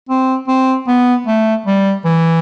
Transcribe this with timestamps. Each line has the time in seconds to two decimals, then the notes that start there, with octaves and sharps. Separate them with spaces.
0.09 C4
0.48 C4
0.87 B3
1.27 A3
1.66 G3
2.05 E3